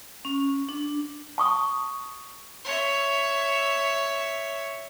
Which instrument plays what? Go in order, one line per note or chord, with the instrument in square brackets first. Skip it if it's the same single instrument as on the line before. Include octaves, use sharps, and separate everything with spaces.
[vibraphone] C#4
D4
[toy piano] A5 C#6 D#6
[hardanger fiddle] C#5 E5